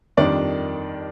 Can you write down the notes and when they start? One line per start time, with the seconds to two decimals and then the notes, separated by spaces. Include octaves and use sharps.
0.17 F2 D#3 G3 D4 D5